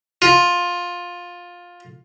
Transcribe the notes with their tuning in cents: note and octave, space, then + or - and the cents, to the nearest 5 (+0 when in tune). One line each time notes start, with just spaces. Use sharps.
F4 +15